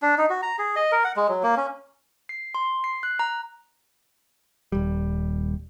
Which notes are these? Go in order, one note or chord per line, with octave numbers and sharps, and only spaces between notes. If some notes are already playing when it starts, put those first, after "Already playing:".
D4
D#4
F#4
A#5
G#4
D#5
A#4
F#5
G#3
F#3
A#3
C#4
C7
C6
C7
F#6
A#5
D#1 G3